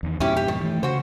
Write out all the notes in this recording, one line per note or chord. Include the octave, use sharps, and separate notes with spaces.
E2 D#3
F2 G#2 B2 C#4 E4 G4
G4
D#3
E3 A3
C#3 F#4 C5